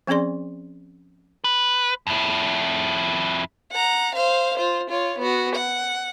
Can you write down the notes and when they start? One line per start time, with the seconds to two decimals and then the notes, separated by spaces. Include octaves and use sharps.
0.07 F3 C4 C#4 G#4 D5 C6
1.44 B4
2.07 F2 E4
3.72 F#5 A#5
4.14 C5 F5
4.57 F4 C5
4.90 F4 C#5
5.19 B3 F#4
5.55 F#5